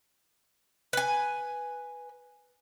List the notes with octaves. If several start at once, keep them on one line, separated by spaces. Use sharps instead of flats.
B4 G#5